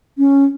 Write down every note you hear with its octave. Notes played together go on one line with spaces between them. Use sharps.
C#4